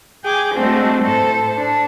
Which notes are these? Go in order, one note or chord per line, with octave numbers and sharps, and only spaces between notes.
G#4 G5 G#5 D6
G#3 A3 C4 D4 F#4
A2 A4 C5
D4